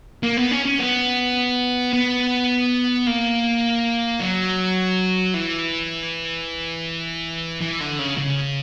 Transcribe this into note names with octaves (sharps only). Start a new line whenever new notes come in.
A#3
B3
C#4
C#4
B3
B3
A#3
F#3
E3
E3
D3
C#3
C#3